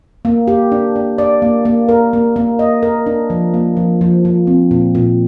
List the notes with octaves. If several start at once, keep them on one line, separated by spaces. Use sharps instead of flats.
A#3
G4
D4
D4
D5
A#3
A#3
A#4
A#3
A#3
D#5
A#4
D4
F3
A#3
F3
F3
F3
C4
A#2
A#2